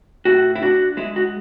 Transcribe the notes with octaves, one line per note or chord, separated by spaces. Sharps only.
A2 F#4
E4
D4 F#4
G#3 E4
F#4